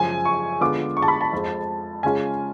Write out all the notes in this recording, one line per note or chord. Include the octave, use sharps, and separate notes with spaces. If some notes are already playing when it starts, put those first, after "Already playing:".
Already playing: F#2 C#3 F3 G#5
C#6
D3 G#3 B3 F4 D6
C#6
A5
B5
A5
F2 F3 G#3
C#3 G#3 C#4 F4 G#5